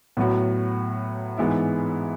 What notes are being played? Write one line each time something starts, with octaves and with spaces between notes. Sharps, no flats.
A2 F#3 B3 F#4
G#2 E3 G#3 B3 E4